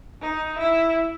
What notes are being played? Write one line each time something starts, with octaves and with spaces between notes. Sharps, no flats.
D#4
E4